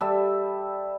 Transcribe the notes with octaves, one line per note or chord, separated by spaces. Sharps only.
G3 A4 E5